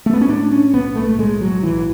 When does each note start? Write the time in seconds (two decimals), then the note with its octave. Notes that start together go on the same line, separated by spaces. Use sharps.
0.06 A3
0.13 B3
0.21 C#4
0.28 A2 D4
0.51 C#4
0.73 B1 B3
0.95 A3
1.09 A3
1.18 A2 G#3
1.41 F#3
1.62 B1 E3